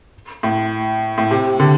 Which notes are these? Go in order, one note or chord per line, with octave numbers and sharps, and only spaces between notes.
A2
A2
C3
D3